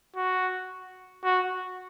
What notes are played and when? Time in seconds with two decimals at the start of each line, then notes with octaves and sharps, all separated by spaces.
0.16 F#4
1.24 F#4